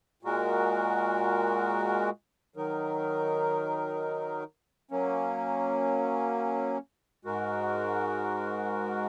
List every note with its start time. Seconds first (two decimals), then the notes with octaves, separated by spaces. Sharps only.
0.23 A#2 G#3 F#4 A#4
2.56 D#3 F#3 D#4 A#4
4.91 F#3 A#3 C#4
7.25 G#2 G#3 F#4 A#4